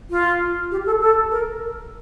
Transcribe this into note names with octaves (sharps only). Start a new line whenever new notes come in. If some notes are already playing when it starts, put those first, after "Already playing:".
F4
G4
A4
A4
A#4